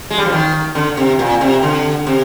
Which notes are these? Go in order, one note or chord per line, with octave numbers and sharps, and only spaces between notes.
G#3
G3
F3
D#3
D3
C3
A#2
C3
D3
C3